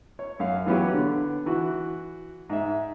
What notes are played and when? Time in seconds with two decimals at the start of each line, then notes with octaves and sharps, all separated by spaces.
0.19 C#5
0.40 F#2 F5
0.66 E3 F#3 B3 C#4 G4
0.94 D3 B3
1.46 E3 F#4
2.50 G#2 E5